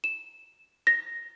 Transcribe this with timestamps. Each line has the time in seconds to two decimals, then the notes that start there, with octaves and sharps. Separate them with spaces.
0.04 E7
0.87 A#6